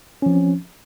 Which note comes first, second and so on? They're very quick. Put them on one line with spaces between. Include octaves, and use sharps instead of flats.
C#4 F3 C4